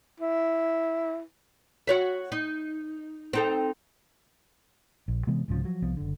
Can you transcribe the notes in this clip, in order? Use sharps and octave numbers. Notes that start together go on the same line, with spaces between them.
E4
F#4 C#5 E5
D#4
C4 D#4 A4
A#1
C3 E3 G#3 B3
C2 G#2 C#3 F3
F3 F#3
C2 F3 B3
F#1 D3